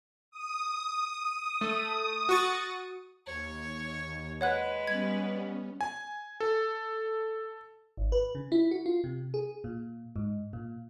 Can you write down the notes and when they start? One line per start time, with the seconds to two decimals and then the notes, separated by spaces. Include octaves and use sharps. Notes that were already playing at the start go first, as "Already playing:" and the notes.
0.31 D#6
1.61 A3
2.29 F#4 C#6 A6
3.26 D#2 C#5
4.41 G#3 B4 C#5 F#5 F#6
4.87 G3 B3 C#4 G#6
5.81 G#5
6.40 A4
7.97 G#1
8.12 B4
8.35 C#3
8.52 E4
8.71 F#4
8.86 F4
9.04 C3
9.34 G#4
9.64 A#2
10.16 G#2
10.53 A#2